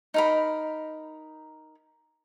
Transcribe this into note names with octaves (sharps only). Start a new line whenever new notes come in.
D#4 A#4 B5